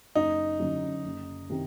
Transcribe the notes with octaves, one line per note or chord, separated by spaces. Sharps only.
F#1 D#4
F#2 D3 F#3
F#1
C3 D#3